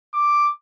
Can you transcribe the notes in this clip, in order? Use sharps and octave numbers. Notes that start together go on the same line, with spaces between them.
D6